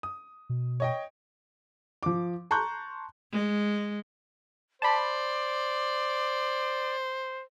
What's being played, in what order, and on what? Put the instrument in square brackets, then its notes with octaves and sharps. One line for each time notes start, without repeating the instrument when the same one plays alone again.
[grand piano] D#6
[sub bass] B2
[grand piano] C#5 D#5 G5
[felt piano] F3 D6
A5 A#5 C6 C#6 F#6 G6
[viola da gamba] G#3
[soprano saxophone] C5 [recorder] D5 [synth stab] A5 B5